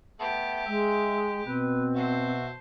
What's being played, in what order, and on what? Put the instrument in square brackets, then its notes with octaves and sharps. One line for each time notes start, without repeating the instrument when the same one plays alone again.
[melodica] A3 B3 A4 [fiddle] G4
[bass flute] G#3 [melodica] E5
[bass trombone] B2 [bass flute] C4 [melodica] B4
[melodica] F#4 E5 [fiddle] C5 A5